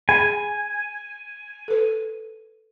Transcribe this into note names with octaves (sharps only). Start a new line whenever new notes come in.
G#4 G#5 B5
A4 B4